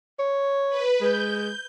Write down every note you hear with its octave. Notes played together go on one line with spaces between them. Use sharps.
C#5
B4
G#3 G6